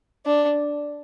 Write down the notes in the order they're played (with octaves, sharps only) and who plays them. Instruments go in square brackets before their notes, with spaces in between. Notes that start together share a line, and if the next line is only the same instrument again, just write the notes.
[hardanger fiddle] D4